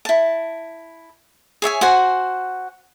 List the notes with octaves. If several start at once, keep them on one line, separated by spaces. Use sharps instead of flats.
E4 A5
G#4 C#5 E5 G#5
F#4 C5 F#5 G#5